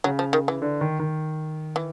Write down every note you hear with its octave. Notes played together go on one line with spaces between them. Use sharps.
C#3 F#3
F3
D#3
E3
D3
D#3
D#3
E3